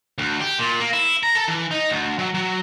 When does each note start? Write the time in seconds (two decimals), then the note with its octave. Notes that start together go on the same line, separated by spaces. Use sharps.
0.18 D2
0.41 G4
0.59 A#2
0.80 A#3
0.93 E4
1.23 A#5
1.35 A4
1.48 E3
1.71 D#4
1.90 D2
2.19 F#3
2.34 F#3